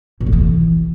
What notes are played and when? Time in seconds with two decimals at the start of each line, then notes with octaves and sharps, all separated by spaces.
0.20 B2
0.26 A2
0.32 E3